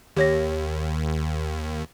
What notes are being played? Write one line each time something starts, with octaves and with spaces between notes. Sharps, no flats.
D#2 G4 C#5 A#6